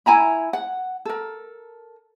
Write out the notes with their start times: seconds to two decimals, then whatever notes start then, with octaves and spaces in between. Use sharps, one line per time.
0.06 E4 G#5 A#5 B5
0.53 F#5
1.05 A4 A#4